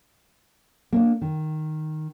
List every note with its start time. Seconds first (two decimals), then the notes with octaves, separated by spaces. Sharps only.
0.92 A#3 C#4 D4
1.21 D#3